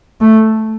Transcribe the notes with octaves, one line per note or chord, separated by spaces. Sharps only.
A3